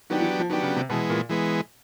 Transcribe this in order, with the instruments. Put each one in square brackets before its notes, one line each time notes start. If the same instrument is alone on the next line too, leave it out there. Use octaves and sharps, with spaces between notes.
[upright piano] D#3 [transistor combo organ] F#3 B3 D4 G4
[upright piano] E3
F3
[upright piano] D#3 [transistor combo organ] F#3 B3 D4 G4
[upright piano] C#3
C3
[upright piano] B2 [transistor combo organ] E3 G#3 B3
[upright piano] A#2
[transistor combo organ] E3 G#3 B3